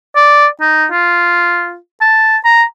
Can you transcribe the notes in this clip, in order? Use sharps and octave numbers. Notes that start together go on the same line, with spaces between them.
D5
D#4
F4
A5
A#5